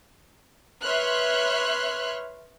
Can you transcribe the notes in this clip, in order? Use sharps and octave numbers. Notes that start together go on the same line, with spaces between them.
B4 C#5 E5 C6 F6 F#6